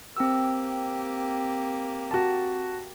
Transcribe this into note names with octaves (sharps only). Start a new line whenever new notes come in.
A#3 C4 G4 E6
F#4 A5